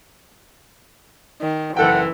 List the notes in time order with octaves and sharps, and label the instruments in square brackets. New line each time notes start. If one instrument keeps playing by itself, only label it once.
[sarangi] D#3
[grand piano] F#1 A4 G5 [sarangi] E3 [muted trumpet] F#5